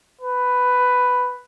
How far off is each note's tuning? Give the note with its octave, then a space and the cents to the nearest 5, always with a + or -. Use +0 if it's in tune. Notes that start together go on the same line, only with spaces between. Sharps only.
B4 +5